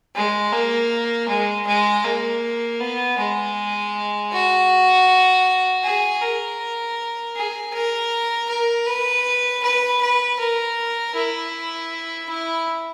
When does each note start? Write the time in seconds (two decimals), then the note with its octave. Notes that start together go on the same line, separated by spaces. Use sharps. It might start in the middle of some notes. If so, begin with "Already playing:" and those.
0.16 G#3
0.53 A#3
1.29 G#3
1.67 G#3
2.04 A#3
2.81 B3
3.18 G#3
4.33 F#4
5.84 G#4
6.22 A#4
7.36 G#4
7.73 A#4
8.50 A#4
8.87 B4
9.63 B4
10.01 B4
10.39 A#4
11.15 E4
12.29 E4